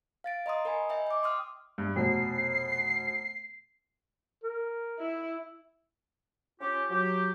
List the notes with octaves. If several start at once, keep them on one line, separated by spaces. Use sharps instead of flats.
F5 A6 D7
D#5 A#5 C6 D#6
A#4 D#5 G#5 B5
D#5 E5 G5
G5 D6
C6 D#6 F6
G2
F1 B2 C7
A#4
E4
C#4 F4 G4
F#3 G4